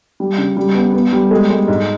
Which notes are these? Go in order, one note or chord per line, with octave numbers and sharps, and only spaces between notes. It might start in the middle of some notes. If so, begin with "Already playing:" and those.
G3
C#3
G3
B3
B3
G3
G#3
G#3
G#2